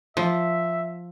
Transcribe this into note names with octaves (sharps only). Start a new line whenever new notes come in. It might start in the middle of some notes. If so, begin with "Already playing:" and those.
F3 E5